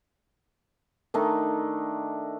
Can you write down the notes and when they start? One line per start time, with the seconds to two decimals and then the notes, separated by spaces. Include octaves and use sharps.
1.14 D#3 A3 D4 D#4